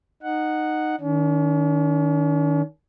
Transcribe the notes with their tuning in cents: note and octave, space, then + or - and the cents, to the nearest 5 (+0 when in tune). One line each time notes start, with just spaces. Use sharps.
D#4 -15 F#5 +0
D#3 +0 C#4 +45